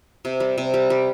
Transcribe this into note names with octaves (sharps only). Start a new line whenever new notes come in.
C3
G3
C3
G3
G3